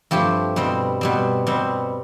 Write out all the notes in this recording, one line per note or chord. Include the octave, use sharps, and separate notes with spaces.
G2 F3 A3 C4 G4
B2 G3 C4
B2 G3 C4
B2 G3 C4